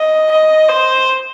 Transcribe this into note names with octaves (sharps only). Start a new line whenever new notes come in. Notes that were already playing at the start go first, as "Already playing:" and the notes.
Already playing: D#5
D#5
C5